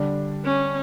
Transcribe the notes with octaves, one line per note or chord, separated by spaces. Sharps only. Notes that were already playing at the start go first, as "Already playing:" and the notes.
Already playing: D3 G3 D4
C#4